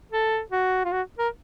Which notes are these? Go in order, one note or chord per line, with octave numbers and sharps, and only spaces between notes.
A4
F#4
F4
F#4
A#4